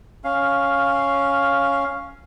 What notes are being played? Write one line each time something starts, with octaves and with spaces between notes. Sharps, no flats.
C#4 F5